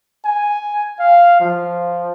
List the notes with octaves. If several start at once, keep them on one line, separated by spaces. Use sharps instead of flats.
G#5
F5
F3